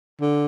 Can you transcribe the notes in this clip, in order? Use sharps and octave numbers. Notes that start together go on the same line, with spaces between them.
D3